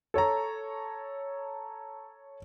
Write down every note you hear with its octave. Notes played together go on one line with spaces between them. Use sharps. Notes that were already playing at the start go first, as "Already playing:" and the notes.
A4 C#5 A5 A#5